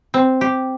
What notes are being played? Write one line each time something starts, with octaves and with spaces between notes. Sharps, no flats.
C4
G4